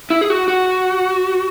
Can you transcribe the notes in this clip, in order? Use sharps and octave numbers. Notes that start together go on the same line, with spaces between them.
E4
G#4
F#4
F#4